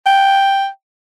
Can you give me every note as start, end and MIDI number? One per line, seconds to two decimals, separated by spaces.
0.06 0.67 79